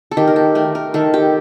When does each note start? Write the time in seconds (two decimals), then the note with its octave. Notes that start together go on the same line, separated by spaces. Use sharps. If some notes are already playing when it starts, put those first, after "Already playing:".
0.11 A4
0.17 D#3 G4
0.27 A#4
0.36 A4
0.55 A3 A#4
0.75 A#4
0.94 D#3 A4
1.14 G4